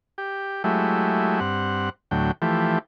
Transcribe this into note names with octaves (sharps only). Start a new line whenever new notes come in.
G4
F#3 G#3 A3 E4 G4
G2 C4 F#5
D2 A2 F#3 G5
E3 F3 A3 G4